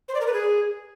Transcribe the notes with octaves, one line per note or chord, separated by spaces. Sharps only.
C5
D5
A#4
B4
G#4